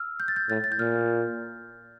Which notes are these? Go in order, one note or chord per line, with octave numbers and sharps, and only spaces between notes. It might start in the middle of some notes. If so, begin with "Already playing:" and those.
Already playing: E6 F6
G6
A6
G6
A2 A6
A6
G6
A#2 F6